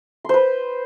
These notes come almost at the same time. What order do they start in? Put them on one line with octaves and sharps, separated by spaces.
C6 C5 B4